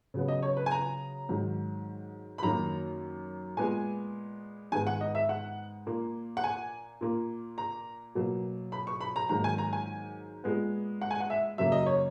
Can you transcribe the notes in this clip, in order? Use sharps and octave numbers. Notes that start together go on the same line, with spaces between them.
C#3 F#3 B3
D#5
C#5
B4
G#5
A#5
G#2 D#3 F#3
B5
F#2 D#3 A#3 A#5
A#2 G#3 B3 G#5
G#2 D#3 G#3 B3 G#5
F#5
D#5
E5
F#5
A#2 A#3
F#5
G#5
A#2 A#3
A#5
B2 F#3 A#3
B5
C#6
B5
A#5
G#2 D#3 F#3 A#3 A#5
G#5
A#5
G#5
A#2 G#3 B3
F#5
G#5
F#5
E5
F#2 C#3 F#3 A#3 E5
D#5
C#5